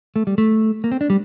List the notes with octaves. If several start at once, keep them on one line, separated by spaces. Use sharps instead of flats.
A3
G3
A3
A#3
C4
D4
G3